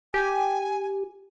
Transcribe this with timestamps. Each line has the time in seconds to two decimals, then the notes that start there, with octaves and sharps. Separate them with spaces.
0.14 G4 G#5